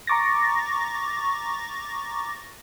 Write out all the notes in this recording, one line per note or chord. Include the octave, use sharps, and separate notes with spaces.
A#5 C#6 D6 A6 A#6